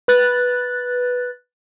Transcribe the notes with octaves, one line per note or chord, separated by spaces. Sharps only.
B4 F#6 A6